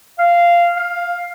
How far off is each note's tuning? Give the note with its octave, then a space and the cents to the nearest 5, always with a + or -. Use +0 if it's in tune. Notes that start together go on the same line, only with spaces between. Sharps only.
F5 -10
F5 +10